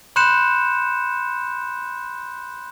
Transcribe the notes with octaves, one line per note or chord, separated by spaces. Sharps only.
B5 C6 F#6 G6 C#7 E7